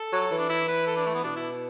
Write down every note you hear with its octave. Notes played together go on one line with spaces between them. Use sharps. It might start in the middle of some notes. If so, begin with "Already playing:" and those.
Already playing: A4
F#3
E3
D4
E4
B4
A4
D4
A3
B3
B2 D4
E4